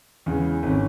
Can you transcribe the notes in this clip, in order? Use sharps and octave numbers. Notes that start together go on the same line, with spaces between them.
E2 C#3 E3 G#3
G#1 E3 C#4